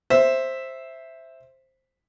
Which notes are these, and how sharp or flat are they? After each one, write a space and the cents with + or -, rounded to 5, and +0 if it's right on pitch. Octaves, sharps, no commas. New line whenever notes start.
C5 +10 E5 +0